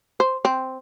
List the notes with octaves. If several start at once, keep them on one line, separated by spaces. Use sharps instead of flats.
C5
C4